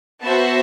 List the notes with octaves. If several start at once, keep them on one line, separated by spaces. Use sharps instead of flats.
B3 F#4 C5 E5 A5